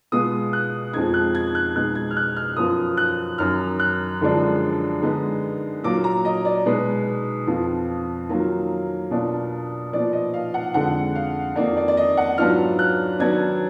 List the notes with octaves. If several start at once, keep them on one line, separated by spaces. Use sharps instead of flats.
B2 G#3 B3 F4 D#6
F#6
F2 F3 G#3 D#4 G#6
F#6
G#6
F#6
B2 G#3 D#4 F#6
G#6
F6
F#6
F6
F#2 F3 B3 F4 D#6
F#6
F#2 D#3 F#3 F6
F#6
F#2 D3 F3 G#3 D4
D3 G#3 B3 D#4
A#2 F#3 A#3 F4 D6
A#5
D#5
D5
B2 G#3 D#4 B4
F2 F3 B3 F4
D#3 F#3 A#3 F4
B2 A#3 D4 F4
A#2 F3 B3 D5
D#5
F5
F#5
F2 D3 G#3 F#5
F5
F2 D#3 A#3 D#4 D5
D5
D5
D#5
F#5
G#2 F#3 B3 D4 F4 F6
F#6
D#3 F#3 B3 D4 G#6